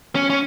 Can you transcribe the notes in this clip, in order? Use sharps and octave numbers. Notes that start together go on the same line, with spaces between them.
C#4
C#4